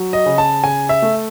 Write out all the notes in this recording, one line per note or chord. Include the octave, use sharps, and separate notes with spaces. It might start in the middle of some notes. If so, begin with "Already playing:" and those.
Already playing: F#3
D#5
C#3
A5
C#3 G#5
E5
A3